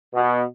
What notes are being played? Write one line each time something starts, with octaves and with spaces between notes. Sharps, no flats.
B2